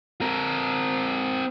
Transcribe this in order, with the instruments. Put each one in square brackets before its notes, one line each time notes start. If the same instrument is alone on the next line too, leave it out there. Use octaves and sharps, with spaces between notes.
[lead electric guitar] C4 A#4